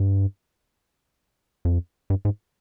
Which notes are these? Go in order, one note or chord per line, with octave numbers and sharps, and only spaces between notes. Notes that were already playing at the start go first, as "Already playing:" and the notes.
Already playing: G2
F2
G2
G#2